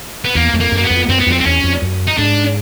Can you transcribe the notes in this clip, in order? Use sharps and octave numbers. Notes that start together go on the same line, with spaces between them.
B3
E2 A#3
F2
A#3
F#2
A#3
B3
F2
F#2 C4
B3
F2 C4
C4
E2 C#4
F2
F#2
D#4
G#2 D4